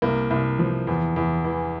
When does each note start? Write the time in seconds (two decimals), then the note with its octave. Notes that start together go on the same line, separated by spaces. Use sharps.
0.02 C2 A#3
0.31 C2
0.59 F3
0.87 E2
1.16 E2
1.44 E3